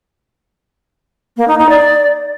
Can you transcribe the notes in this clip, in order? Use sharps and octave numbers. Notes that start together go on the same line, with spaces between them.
A#3
D#4
D#4
D5